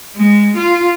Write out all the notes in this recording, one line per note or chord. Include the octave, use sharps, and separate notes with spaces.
G#3
F4